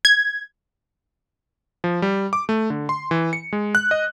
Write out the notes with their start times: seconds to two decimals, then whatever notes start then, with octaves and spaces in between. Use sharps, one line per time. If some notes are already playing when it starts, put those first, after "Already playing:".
0.05 G#6
1.84 F3
2.02 G3
2.33 D6
2.49 A3
2.70 D3
2.89 C6
3.11 E3
3.33 C#7
3.53 G#3
3.75 F#6
3.91 D#5